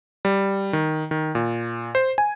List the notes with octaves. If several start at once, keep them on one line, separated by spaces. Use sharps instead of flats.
G3
D#3
D#3
A#2
C5
G#5